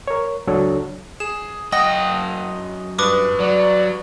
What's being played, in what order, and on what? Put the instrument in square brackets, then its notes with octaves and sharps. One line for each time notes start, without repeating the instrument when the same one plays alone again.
[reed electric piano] A#4 C#5
C#2 F#3 D4 A4 C#5
[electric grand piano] G#4 [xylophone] E7
[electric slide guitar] F#2 G5 [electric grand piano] D#5 F#5 D#6 [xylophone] A#6
[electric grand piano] G2 [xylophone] B4 D6 D#6
[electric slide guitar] F#3 [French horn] D5